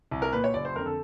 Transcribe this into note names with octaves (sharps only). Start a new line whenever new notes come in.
C2
A#4
A#2 B4
C#5
F#1 D5
C5
F2 D3 A#4
A4